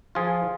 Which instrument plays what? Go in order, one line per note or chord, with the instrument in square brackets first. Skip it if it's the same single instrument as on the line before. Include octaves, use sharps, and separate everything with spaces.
[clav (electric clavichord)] F3 F4 G#4